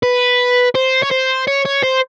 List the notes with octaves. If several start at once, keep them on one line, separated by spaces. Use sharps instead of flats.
B4
C5
C#5
C5
C#5
C#5
C5